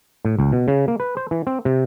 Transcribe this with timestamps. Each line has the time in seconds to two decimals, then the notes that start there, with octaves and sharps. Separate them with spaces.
0.25 A2
0.39 C#2
0.52 B2
0.68 C#3
0.88 A#3
1.00 B4
1.17 C5
1.31 E3
1.47 C4
1.65 C3